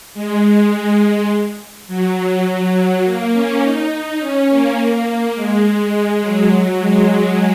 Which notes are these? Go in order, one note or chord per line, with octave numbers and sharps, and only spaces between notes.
G#3
G#3
F#3
F#3
F#3
A#3
C#4
D#4
D#4
C#4
A#3
G#3
G#3
F#3
G#3